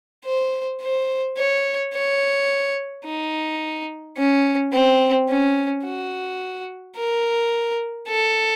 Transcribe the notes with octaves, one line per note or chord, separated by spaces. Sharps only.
C5
C5
C#5
C#5
D#4
C#4
C4
C#4
F#4
A#4
A4